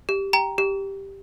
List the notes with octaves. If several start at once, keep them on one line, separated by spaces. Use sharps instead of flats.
G4
G5 A#5
G4